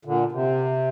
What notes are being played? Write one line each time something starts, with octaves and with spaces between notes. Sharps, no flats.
A#2 D3
C3